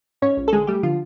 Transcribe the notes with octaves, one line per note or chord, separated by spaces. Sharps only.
G#2 C#4 C#5
A#1
A4
D3 G#3 G#4
G3 A3 G4
D3 F3 F4